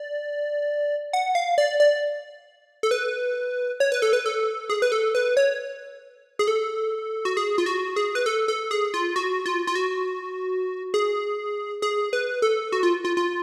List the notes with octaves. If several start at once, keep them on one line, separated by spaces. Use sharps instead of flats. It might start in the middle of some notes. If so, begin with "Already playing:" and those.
Already playing: D5
F#5
F5
D5
D5
A4
B4
C#5
B4
A4
B4
A4
G#4
B4
A4
B4
C#5
G#4
A4
F#4
G#4
F4
F#4
G#4
B4
A4
A4
G#4
F4
F#4
F4
F4
F#4
G#4
G#4
B4
A4
F#4
F4
F4
F4